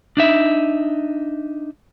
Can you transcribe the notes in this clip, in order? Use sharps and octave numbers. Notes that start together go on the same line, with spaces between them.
D4 D#4 E5